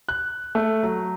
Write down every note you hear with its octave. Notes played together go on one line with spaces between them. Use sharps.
F#6
A3
F#3